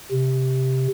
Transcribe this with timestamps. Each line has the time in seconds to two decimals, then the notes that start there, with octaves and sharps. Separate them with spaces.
0.12 C3